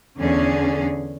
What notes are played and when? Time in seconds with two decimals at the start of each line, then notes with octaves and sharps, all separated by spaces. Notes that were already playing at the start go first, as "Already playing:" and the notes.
0.19 E2 D3 C#4 G#4